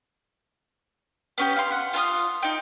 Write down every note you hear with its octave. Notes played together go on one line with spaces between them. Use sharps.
B3 C#4 G4
F5 C6
F#5
F4 F5 A5 D#6
D#4 G5